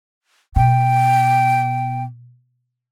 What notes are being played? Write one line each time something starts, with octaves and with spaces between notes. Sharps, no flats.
B2 G5